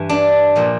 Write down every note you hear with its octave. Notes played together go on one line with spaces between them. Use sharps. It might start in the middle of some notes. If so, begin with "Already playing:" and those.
Already playing: G2 E3
D4
A#2 F3